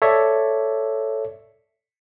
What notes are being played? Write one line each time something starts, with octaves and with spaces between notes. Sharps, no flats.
A4 C#5 D5 E5